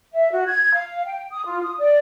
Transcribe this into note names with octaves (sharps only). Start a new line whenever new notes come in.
E5
F#4
G#6
F5
G5
D#6
F4
D#6
D5